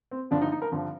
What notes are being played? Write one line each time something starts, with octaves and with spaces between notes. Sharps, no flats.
C4
G2 D3 F3 D4
D#4
D#4
A#4
G2 D3 F3